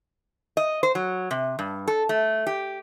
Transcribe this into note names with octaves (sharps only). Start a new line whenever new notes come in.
D#5
C5
F#3
C3
G2
A4
A3
G4